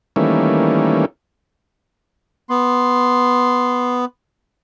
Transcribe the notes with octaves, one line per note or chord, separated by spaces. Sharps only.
D#3 E3 G3 A3 A#3 C#4
B3 C6